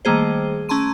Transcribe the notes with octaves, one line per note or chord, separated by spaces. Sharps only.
D#3 G3 A3 A#3 G#4 C5
A3 C#4 A5 A#5 C6 D#7